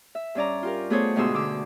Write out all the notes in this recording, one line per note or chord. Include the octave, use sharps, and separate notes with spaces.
E5
G2 C#4 D5 A#5
F4 G4 A#4
A3 B3 G#4 A4 C5 C#5
D2 G#2 B2 G#4 C6 E6
D3 D6 E6